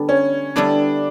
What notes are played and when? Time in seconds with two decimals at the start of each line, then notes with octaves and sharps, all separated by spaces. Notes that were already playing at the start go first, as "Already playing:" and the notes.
Already playing: D3 G3 B3 A4
0.09 C#4
0.56 D3 G3 B3 D4 E4 A4